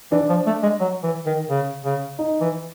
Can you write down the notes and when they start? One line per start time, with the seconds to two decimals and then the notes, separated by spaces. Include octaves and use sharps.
0.12 E3 D4
0.29 F3
0.47 A3
0.63 G#3
0.80 F#3
1.03 E3
1.26 D#3
1.50 C#3
1.85 C#3
2.19 D#4
2.41 E3